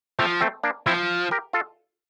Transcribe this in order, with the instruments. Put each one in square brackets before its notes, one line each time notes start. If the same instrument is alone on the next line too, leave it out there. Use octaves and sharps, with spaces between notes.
[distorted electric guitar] F3 [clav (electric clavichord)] A3 C4
[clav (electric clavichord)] A3 C4
A#3 D4
[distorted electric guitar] F3 [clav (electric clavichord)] C4 E4
[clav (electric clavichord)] G4 A#4
F4 A4